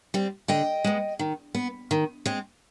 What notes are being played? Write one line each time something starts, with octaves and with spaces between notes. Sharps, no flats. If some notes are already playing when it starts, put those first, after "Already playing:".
G3 C4
D3 D#5 G5
G#3 B3
D#3
B3
D#3
G#3 C4